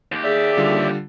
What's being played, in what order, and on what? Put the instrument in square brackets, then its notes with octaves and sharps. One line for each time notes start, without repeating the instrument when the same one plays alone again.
[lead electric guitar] D#2 G4
[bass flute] G#4 [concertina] D5 E5
[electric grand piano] D3 G3 F4